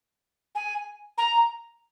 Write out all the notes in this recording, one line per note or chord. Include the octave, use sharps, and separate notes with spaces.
G#5
A#5